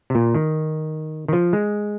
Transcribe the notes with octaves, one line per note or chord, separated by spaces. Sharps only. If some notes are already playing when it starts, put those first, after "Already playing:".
C3
A#2
D#3
D#3
F3
G#3